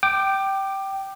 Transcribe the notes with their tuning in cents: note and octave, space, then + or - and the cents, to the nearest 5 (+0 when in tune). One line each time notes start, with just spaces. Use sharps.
G5 -15 D6 +20